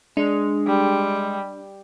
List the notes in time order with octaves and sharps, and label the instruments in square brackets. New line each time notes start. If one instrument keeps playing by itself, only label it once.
[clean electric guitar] G#3 [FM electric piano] D4
[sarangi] G3